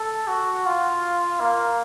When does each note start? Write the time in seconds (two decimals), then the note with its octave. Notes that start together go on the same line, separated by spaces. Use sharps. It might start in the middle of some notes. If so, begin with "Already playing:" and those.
Already playing: A4
0.27 F#4
0.66 F4
1.40 A#3